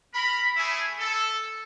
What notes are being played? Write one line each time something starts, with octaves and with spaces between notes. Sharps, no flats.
A#4 B5
A3 C#4 E4 G#4
A4